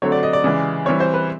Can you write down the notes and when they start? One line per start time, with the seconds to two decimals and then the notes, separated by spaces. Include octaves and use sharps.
0.02 D3 F#3 A3 C4 C#5
0.12 D5
0.23 D#5
0.33 D5
0.44 C#3 E3 G#3
0.86 E3 G3 C4 C#5
1.00 C5
1.14 B4